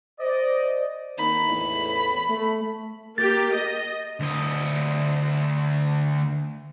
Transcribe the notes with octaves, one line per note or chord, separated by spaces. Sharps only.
C5 D5 D#5
D#3 A#3 D#4 B5
E2 A2
A3
A#3 G4 A6
D#5
D2 D#5